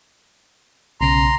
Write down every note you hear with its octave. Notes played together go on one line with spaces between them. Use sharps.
B1 C#3 A#5 C6 A#6